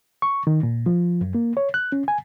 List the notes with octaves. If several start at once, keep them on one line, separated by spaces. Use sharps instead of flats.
C#6
D#3
A#2
F3
F#2
A#3
C#5
F#6
C#4
G#5